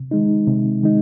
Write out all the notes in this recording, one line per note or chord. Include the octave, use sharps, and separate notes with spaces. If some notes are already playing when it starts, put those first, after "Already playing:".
Already playing: C3
D#3 G#3 D#4
C3
D#3 G#3 D#4